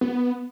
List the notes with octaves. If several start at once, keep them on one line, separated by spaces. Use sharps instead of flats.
B3